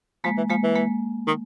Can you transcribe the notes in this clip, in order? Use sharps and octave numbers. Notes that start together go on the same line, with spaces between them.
F3 G#3 A#3
E3
F3 G#3 A#3
E3
G#3 A#3
D#3